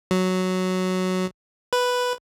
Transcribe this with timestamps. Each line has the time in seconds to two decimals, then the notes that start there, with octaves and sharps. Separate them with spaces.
0.11 F#3
1.73 B4